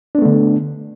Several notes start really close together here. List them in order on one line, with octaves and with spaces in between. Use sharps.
D4 B3 A3 D3